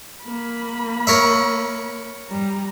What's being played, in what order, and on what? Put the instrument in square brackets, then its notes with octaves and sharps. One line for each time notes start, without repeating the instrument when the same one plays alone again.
[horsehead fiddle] A#3 B5
[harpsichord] A#4 C#5 E5
[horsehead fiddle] G3 A#5